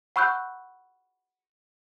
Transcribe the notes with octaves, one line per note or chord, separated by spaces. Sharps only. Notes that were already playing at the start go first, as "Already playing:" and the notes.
F#5 B5 C#6 E6 F#6 G6